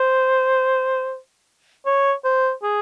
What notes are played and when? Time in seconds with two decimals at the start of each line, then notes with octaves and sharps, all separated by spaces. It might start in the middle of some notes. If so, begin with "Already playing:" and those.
Already playing: C5
1.86 C#5
2.25 C5
2.63 G#4